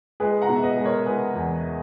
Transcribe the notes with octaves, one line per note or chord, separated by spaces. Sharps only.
G#3 G#4 B4
F#5 A#5
B2
E5
B4 D#5
G#3
A#4 C#5
G#3 G#4 B4
E2